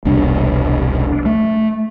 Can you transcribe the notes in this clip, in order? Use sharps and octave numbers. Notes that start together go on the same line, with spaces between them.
E1 C2 B3 D4
A3